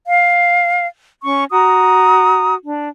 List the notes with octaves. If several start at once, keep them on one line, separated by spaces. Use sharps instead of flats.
F5
C#4 C#6
F#4 A#5 D#6
D4